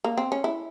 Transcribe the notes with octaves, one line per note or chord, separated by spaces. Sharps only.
A#3
C4
C#4
E4